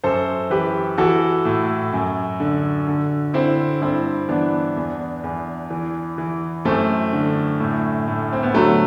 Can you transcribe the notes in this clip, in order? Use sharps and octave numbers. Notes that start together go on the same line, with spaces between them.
F#2 A4 C5
E3 G4 B4
E3 F#4 A4
A2
F#2
D3
D3
D3 C4 E4
G2 C4 E4
E3 B3 D4
E2
E2
E3
E3
F#2 A3 C4
D3
A2
A2
C4
B3
D3 F#3 A3